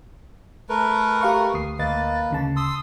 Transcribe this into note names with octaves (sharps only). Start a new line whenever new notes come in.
A3 A#4 B4
G4 F5 C#6
D2 D#6 C7
D2 A#3 B4 D#5 A6
D2 C#3 A5
C6 D#6 E6